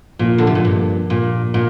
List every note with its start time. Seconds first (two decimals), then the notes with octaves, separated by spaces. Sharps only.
0.19 A#2 F3 A#3 F4
0.38 D3
0.47 C3
0.55 A#2
0.65 G2
1.10 A#2
1.54 A#2